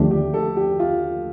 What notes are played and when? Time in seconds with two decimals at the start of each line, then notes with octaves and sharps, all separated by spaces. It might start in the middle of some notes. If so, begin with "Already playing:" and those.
Already playing: D#2 D3 F3 A3 D4 G4
0.11 G4
0.34 A4
0.57 G4
0.79 F4